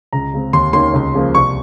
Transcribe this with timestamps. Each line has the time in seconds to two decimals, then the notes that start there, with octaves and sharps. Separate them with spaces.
0.13 C#2 A#5
0.34 C#3 G#3 C4
0.53 D#2 C6
0.73 D#3 A#3 C#4 C6
0.94 C#2
1.14 C#3 F3 A#3
1.34 C2 C#6